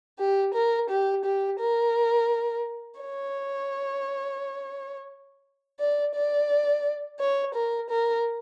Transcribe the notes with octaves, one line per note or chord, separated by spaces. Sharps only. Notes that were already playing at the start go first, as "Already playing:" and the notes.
G4
A#4
G4
G4
A#4
C#5
D5
D5
C#5
A#4
A#4